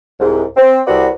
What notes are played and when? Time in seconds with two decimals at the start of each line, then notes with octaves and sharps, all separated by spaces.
0.19 C2 G#2
0.57 C4
0.87 C2 C4 F#4 B4 D5 F#5